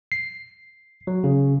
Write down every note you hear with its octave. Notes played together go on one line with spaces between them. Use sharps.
C7
F#3
C#3